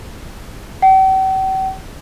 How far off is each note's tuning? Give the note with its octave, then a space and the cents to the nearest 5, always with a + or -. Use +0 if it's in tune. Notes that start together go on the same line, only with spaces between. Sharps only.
G5 -45